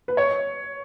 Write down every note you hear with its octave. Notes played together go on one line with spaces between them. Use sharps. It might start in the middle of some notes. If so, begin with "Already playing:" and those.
B4
C#5